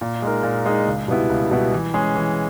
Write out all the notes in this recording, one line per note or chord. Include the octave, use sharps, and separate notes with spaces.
A#2
G#3 D#4 A#4
A#2
G#3 D#4 A#4
C#2
B2 G3 B3 E4
C#2
B2 G3 B3 E4
E3
G#3 C#4 G#4
E3